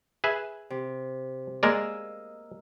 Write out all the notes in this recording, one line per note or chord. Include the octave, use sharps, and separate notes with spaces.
G#4 B4 E5
C3
G#3 A#3 A#4 D5 D#5 E6